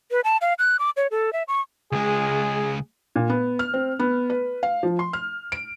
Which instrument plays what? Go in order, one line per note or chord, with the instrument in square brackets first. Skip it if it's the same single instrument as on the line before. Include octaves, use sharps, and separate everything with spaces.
[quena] B4
A5
F5
F#6
D6
C#5
A4
E5
C#6
[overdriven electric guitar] C#2 G#3 [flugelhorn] G#4
[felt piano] A#2
B3
F6
C4
B3
B4
F5
F3
C6
F6
D7